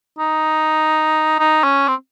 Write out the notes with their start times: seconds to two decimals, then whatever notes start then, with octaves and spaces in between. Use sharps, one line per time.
0.19 D#4
1.39 D#4
1.64 C#4
1.88 C4